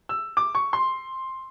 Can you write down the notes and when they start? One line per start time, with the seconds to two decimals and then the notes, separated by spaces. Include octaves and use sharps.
0.09 E6
0.37 D6
0.55 C#6
0.73 C6